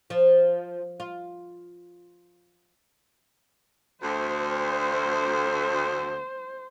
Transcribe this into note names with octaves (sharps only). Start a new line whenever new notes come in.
F3
F4
D2 C5